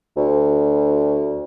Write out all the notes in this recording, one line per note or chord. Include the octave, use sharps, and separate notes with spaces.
D2